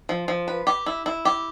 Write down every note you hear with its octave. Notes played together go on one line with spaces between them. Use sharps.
F3
F3
B4
G4
E4
E4
G4